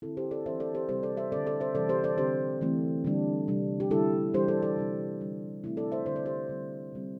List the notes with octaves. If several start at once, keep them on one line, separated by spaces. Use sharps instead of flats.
D3 C4 E4 A4
G4 C5
A4 D5
E3 C4 C5 E5
A4 D5
G4 C5
C3 G3 C4 G4 C5
A4 D5
C5 E5
D3 C4 A4 D5
A4 D5
C5 E5
C3 E3 G3 A4 D5
G4 C5
A4 D5
D3 C4 G4 C5
E3 A3 C4
D3 G3 D4
C3 G3 D4
G4
D3 G3 D4 E4 A4
E3 G3 D4 G4 C5
A4 D5
A4 D5
C3 G3 D4
D3 G3 D4
C3 A3 C4 E4
A4 D5
C5 E5
D3 A3 D4 C5
D5
G4 C5
D3 G3 C4
C3 G3 C4